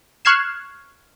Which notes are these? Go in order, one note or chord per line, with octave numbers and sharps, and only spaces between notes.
C#6 F6 F#6 G#6 C7 E7